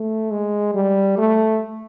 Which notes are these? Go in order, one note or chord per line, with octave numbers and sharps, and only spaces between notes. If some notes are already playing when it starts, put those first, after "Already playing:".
Already playing: A3
G#3
G3
A3